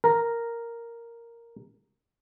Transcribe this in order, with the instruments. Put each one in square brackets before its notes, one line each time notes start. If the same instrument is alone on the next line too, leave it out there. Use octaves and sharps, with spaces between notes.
[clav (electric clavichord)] A#4 A#5